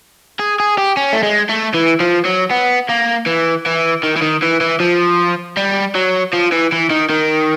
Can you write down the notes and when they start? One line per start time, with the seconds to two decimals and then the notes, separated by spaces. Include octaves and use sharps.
0.40 G#4
0.60 G#4
0.78 G4
0.97 C#4
1.13 A3
1.23 G#3
1.49 A3
1.74 E3
2.00 F3
2.25 F#3
2.50 B3
2.89 A#3
3.27 E3
3.66 E3
4.04 D#3
4.17 E3
4.22 D#3
4.43 E3
4.61 E3
4.80 F3
5.57 G3
5.95 F#3
6.33 F3
6.52 E3
6.72 E3
6.90 D#3
7.10 D#3